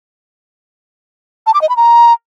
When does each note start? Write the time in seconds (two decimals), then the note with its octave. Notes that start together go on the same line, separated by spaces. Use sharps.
1.47 A5
1.54 D6
1.62 D#5
1.69 B5
1.77 A#5